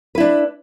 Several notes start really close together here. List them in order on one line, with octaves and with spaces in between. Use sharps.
B4 E4 D4